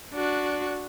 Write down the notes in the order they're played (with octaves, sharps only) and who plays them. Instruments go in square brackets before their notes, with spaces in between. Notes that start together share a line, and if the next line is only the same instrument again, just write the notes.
[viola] D4 F#4